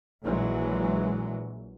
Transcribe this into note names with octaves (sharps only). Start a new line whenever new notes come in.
A#1 A#2 E3 F#3 G#3